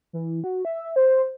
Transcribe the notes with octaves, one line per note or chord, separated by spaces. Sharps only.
E3
F#4
E5
C5